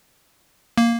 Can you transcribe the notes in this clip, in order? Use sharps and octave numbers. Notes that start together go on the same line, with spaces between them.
A#3